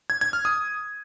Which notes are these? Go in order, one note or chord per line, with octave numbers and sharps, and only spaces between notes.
G#6
G#6
F6
D#6